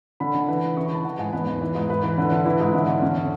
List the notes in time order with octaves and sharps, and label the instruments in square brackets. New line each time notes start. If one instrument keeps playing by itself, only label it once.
[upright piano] D3 B5
D3
E3
E3
C#3 C#6
B5
E3 A5
E3 F#5
G#2 G#5
E2 B4
E2
E3
G#2
G#2 B4
E3
D3
D3
E3 E4
G#2
D3
D3
E2 C#4
D3